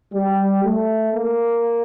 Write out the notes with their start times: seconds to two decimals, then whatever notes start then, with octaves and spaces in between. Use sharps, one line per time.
0.13 G3
0.63 A3
1.13 A#3